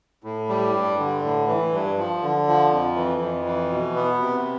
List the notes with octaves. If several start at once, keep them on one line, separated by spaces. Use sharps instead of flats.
A2
G3
G2
D3
A2
E3
G2
F3
D3
F3
F2
E3
F2
E3
B2
B3
C3